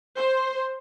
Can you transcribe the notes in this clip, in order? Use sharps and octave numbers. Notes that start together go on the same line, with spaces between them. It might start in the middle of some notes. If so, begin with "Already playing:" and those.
C5